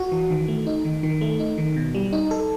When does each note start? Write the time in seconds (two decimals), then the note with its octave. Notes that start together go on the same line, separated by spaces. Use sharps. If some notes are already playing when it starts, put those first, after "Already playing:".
Already playing: F#4
0.12 E3
0.30 D#3
0.48 A3
0.67 D#4
0.85 D#3
1.03 D#3
1.21 A3
1.39 D#4
1.58 D#3
1.76 B2
1.95 G3
2.13 D#4
2.31 A4